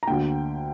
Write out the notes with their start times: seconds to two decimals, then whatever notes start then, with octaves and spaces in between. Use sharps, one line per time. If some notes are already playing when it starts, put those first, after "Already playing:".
0.03 A#5
0.07 D2 D3 A#3 G5